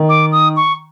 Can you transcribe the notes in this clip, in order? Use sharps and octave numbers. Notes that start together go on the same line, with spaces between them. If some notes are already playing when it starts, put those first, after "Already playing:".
Already playing: D#3
D6
D#6
C#6